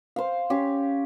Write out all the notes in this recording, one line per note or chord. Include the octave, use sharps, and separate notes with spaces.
C5 F5
C#4 G4